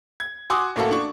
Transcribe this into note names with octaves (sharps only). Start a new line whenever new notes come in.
G#6
F#4 G#5 C6 D6 D#6 F#6
A1 A3 A#3 F#4 A4
D4 C#6